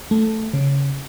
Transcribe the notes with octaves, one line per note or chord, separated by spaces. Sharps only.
A3
C#3